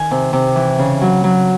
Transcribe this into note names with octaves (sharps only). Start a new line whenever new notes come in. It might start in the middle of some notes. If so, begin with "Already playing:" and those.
Already playing: D#3 G#5
C3
C3
E3
C#3
F#3
F#3